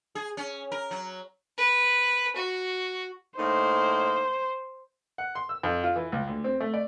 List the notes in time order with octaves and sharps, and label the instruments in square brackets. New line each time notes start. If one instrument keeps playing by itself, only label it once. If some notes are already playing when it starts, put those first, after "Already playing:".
[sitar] G#4
C#4
A#4
F#3
[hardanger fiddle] B4
F#4
[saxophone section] A2 A#3 D#4 [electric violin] C5
[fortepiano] F#5
C6
E6
F2
F4
E3
C#2
D2
C4
A3
D5